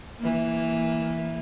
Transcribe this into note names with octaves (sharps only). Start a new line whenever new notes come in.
E3 A#3